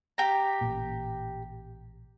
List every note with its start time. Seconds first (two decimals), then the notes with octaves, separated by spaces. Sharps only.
0.18 G4 A#5
0.61 A1 A#2